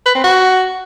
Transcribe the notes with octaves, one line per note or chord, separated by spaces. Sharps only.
B4
C4
F#4